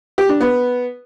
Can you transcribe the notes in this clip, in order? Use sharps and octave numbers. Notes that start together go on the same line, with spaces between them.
G4
D4
B3